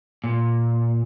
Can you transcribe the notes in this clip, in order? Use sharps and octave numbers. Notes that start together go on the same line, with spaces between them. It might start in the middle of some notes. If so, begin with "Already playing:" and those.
A#2